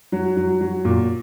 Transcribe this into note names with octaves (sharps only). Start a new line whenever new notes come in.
F#3
F#3
F#3
A#2